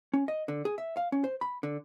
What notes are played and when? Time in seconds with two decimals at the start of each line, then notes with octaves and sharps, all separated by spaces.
0.14 C#4
0.28 D#5
0.48 D3
0.65 G#4
0.78 E5
0.97 F5
1.12 C#4
1.24 C5
1.41 B5
1.63 D3